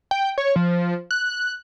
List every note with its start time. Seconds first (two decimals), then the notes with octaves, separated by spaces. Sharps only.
0.11 G5
0.38 C#5
0.56 F3
1.11 F#6